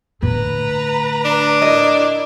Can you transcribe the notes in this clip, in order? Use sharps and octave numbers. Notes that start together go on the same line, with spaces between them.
A2 D3 B4 A#5
D4
E4 A#4 D#5